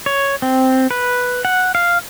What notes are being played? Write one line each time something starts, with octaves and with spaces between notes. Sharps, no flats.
C#5
C4
B4
F#5
F5